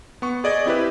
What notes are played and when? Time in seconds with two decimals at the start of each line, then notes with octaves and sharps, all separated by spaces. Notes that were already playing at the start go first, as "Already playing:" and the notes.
0.22 B3 C#6
0.44 G#4 D5 D#5 G#6
0.66 C4 E4 G4 B4